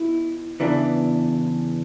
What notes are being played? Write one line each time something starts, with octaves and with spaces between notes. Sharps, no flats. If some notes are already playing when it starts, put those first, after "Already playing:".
Already playing: B2 E4
E2 C#3 E3 B3 D4